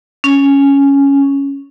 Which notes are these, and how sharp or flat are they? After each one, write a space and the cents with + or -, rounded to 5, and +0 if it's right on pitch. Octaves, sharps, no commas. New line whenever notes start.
C#4 +5